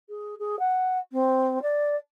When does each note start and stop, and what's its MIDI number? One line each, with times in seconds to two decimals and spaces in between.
0.09 0.35 68
0.39 0.59 68
0.59 0.98 78
1.12 1.61 60
1.62 1.96 74